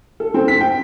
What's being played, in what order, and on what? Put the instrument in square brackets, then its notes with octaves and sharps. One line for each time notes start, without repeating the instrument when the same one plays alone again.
[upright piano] A4
C4
B6
G5